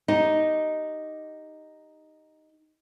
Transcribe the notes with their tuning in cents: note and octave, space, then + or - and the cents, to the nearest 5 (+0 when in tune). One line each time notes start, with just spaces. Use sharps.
D#4 +0 G4 -5